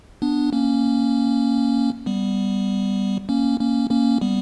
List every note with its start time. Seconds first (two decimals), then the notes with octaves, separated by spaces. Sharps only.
0.22 B3 D4
0.53 A#3 C#4
2.06 G3 B3
3.29 A#3 C#4
3.60 A#3 C#4
3.90 A#3 C#4
4.21 G3 B3